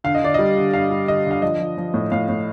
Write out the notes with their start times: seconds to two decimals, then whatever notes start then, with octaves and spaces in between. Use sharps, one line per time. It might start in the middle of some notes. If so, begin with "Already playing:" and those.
0.04 D3 F5
0.15 D#5
0.22 D3 D5
0.34 G3 D#5
0.56 D3
0.73 G2 F5
0.90 G3
1.08 D3 D#5
1.26 D3 F5
1.42 F3 D#5
1.60 F3
1.78 F3
1.94 A2
2.12 A2 F5
2.29 A2